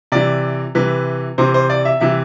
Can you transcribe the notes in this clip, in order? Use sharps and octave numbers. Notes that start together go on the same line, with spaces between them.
C3 E3 D5
C3 E3 B4
C3 E3 C5
C5
D5
E5
C3 E3 E5